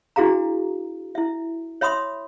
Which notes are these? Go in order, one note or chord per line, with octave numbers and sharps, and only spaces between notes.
D4 E4 F#4 G#4 F5 A#5
E4 E5
C#5 E5 B5 C6 D#6